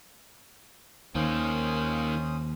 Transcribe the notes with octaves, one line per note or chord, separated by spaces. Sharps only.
D#2 D#3 A#3 C#4 C5 D#6